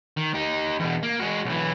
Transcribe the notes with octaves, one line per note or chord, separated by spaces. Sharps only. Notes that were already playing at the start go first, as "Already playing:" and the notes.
D#3
D#4 G4
E2 B2
A#3
G#3 F#4
B1 E3